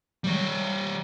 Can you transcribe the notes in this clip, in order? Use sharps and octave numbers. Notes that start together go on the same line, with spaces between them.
G3 C#5